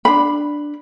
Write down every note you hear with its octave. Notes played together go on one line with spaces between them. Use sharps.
D4 B5